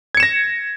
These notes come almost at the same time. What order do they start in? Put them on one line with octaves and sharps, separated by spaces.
G#6 C#7 E7 A#6